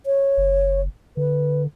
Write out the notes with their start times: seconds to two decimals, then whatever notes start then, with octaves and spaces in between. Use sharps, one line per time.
0.06 C#5
0.37 F#1
1.17 D3 B4